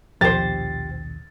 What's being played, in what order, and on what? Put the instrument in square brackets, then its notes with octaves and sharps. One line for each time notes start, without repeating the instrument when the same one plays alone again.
[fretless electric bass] A#1 D#2 B2 [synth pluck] F3 [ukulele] G4 C5 [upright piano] A6